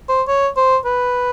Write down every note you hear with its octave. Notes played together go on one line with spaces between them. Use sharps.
C5
C#5
C5
B4